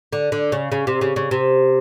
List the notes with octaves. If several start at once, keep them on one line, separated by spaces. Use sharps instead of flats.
D3
D3
C#3
C#3
C3
C#3
C#3
C3